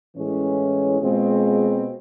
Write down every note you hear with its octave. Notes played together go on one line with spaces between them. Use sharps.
A2 E3 G#3 C#4
B2 G#3 C4 F4 G#4